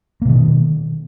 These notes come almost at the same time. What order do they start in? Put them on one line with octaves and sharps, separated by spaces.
A#3 B2 D#3